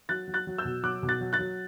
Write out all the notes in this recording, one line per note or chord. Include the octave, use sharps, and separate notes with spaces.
F#3 F#6 A6
F#3
F#6 A6
F#3
E6 G6
B2
F#3 D6 F#6
B2
F#6 A6
F#3
F#6 A6
F#3